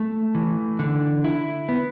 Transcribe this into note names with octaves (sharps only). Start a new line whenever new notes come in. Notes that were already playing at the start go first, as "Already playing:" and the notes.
Already playing: A3
E3
D3
E4
B3